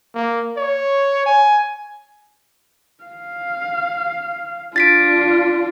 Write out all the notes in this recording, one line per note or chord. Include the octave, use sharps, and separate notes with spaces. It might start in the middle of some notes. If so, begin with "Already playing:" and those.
A#3
C#5
G#5
F5
D4 F4 A6 B6 D7